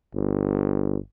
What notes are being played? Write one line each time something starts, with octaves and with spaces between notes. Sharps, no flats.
G1